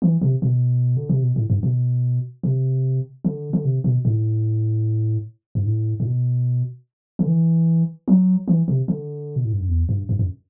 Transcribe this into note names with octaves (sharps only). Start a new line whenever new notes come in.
E3
C3
B2
D3
C3
B2
A2
G2
B2
C3
D3
D3
C3
B2
A2
G2
A2
A2
B2
D3
E3
F#3
E3
C3
D3
B2
A2
G2
F#2
E2
G2
G2
F#2